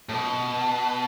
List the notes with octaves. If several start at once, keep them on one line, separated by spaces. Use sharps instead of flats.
A2
B2